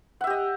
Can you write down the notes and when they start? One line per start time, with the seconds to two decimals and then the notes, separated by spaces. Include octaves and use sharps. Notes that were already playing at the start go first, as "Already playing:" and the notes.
0.21 F#5
0.24 E5
0.27 G4
0.30 D#5